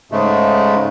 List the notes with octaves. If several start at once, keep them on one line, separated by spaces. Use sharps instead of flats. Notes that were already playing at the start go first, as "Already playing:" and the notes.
G#2 C#3 G#3 A3